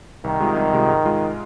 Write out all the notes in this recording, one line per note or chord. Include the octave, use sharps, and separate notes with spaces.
C2 D#3
C3 G#3 F4
C2
C3 G#3 F4
G#2
G#3 F4